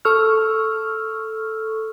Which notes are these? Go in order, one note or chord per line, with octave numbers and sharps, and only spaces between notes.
A4 C#6 E6 F6